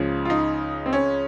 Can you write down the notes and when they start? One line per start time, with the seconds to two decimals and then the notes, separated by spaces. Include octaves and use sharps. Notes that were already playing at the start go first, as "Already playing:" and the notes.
Already playing: C#2 C#3 F3
0.25 F4
0.30 D#4
0.86 C4
0.93 C#4